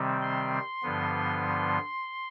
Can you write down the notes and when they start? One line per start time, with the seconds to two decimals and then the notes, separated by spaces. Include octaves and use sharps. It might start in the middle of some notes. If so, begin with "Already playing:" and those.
Already playing: C3 D#3 G3 C4
0.22 C6
0.83 G2 D3 F3 B3